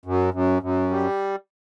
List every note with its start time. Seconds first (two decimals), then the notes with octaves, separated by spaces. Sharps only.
0.05 F#2
0.34 F#2
0.62 F#2
0.91 G3